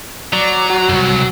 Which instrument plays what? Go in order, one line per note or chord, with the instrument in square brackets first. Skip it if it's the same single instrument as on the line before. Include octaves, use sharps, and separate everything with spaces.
[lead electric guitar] F#3 [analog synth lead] D5 [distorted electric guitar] A#5
[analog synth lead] F#4
[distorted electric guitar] C2 F#2